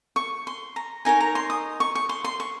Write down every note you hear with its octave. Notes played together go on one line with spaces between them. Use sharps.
C#6
C6
A#5
D#4 A#4 C#5 G#5
A#5
C6
D#6
C#6
C#6
C6
C6
C#6